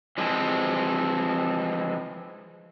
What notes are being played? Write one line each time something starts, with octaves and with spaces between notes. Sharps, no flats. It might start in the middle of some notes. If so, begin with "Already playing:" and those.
E3 F3 G#3 C4